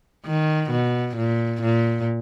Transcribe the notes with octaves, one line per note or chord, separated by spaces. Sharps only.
D#3
B2
A#2
A#2